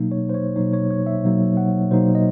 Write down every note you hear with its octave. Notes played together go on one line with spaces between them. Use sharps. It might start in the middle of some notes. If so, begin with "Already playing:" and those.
Already playing: B2 F#3 A#3 D#4
C#5
C5
C#5
B2 F#3 A#3 D#4 C#5
C#5
C#5
E5
B2 F#3 A#3 D#4
F#5
B2 F#3 A#3 D#4 C5
D#5